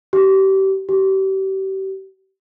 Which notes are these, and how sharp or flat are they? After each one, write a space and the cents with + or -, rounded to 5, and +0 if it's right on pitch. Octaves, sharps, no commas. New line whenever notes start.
G4 -30
G4 -35